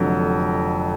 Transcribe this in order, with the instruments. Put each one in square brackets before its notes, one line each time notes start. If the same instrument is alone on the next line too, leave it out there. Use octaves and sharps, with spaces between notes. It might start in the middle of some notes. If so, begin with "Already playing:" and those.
Already playing: [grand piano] F1 F2 D3 F#3